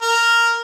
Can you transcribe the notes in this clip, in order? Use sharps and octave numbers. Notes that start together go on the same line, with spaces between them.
A#4